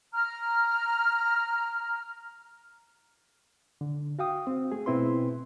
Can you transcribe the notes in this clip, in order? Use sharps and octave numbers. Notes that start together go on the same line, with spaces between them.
A#5 F6
D3
F#4 F5 G5 D#6
C4
A3 G#4
B2 C4 E4 B4 C6